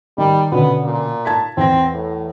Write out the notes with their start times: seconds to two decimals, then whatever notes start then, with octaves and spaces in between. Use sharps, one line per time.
0.18 D#3 G3
0.52 B2 D3 B3 C#4
0.84 A#2
1.25 A5 G#6 B6
1.57 E2 C4 A#6
1.94 A2